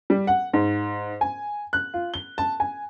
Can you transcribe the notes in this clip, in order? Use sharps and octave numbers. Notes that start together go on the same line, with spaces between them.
G3
F#5
G#2
G#5
F#6
F4
G7
A5
G#5